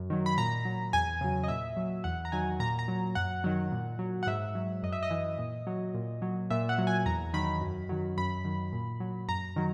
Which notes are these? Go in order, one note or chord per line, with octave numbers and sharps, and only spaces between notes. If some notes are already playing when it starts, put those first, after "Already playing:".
Already playing: F#2
D#3 F#3
B5
A#2 A#5
F#3
E2 G#5
C#3 F#3
D#5
A#2 E5
F#3
E2 F#5
A#5
D#3 F#3 G#5
A#2 A#5
A#5
F#3
F#2 F#5
D#3 F#3
A#2
F#3
F#5
G#2 E5
F#3
F#2 D#5
E5
D#5
E3
A#2
F#3
A#2
F#3
A#2 E5
F#5
F#3
G#5
E2 A#5
D#3 F#3 B5
F#2
D#3 F#3
F#2 B5
D#3 F#3
A#2
F#3
F#2 A#5
D#3 F#3